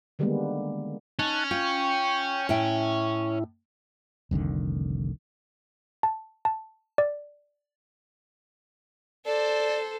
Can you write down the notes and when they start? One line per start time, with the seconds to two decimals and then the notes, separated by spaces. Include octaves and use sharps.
0.19 D3 D#3 G3 G#3 A#3 B3
1.19 C#4 D#4 A5 F#6
1.51 F4 G5 C#6
2.49 A2 E4 E5 G5
4.31 F1 C2 D3 D#3
6.03 A5
6.45 A5
6.98 D5
9.26 A4 C5 D5